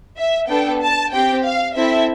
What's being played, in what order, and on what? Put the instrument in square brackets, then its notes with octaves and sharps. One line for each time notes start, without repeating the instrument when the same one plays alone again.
[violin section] E5
B3 D4 A4 G5
A5
C4 G4 G5
F5
C4 E4 A4 E5